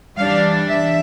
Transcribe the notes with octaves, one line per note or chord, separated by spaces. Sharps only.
E3 G3 D4 F5
E5